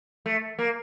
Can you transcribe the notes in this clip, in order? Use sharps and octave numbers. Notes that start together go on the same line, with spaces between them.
A3
A#3